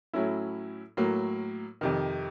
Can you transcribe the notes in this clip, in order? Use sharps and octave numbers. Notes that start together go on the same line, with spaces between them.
A2 F#3 A3 C#4 E4
A2 F#3 A#3
F2 C3 D#3